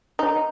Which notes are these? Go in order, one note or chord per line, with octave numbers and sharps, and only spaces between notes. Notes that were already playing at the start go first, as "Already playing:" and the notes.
D#4